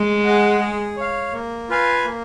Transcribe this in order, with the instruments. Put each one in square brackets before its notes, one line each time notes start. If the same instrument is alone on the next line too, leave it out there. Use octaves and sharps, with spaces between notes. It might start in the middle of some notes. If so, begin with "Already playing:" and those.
Already playing: [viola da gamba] G#3
[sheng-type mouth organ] G#4 D#5 F#5
G#4
C#5 F5
A#3
F4 B4 F5 G#5
A#3